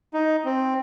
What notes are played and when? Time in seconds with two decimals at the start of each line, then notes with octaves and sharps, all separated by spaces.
0.14 D#4
0.45 C4